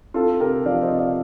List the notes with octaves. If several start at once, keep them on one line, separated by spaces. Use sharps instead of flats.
C4 F4 A4
C3 G4 A#4
F3 D5 F5
C5 D#5
C3
D5 F5